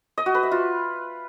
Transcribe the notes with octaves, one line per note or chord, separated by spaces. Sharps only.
D#5
F#4
B4
E5
F4